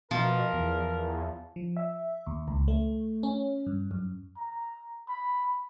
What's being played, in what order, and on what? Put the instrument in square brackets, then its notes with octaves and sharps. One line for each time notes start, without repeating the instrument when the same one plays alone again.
[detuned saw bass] B2 [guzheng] F3 [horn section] A#4
[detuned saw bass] E2
[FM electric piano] F3
E5
D#2
C#2
A3
C#4
G2
F#2
[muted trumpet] A#5
B5